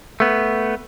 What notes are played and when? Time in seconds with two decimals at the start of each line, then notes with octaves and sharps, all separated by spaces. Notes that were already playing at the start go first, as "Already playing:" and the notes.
0.20 A3 B3